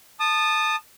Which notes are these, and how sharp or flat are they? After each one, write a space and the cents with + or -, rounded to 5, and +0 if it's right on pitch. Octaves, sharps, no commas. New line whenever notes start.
A5 +0 D#6 -25